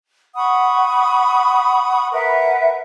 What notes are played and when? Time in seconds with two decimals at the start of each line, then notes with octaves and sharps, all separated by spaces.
0.35 F#5 B5 C#6 D#6
2.12 A#4 B4 E5 F#5